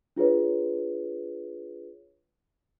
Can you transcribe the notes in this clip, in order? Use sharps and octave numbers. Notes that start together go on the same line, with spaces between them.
D4 F4 G#4 B4 C#5